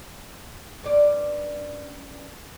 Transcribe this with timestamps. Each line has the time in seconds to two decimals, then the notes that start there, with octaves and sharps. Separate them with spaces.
0.83 G2 C#4 D5